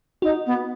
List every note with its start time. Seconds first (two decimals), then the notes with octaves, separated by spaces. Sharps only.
0.22 D#4 F#4
0.46 B3